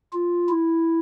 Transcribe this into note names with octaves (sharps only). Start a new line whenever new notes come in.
F4
E4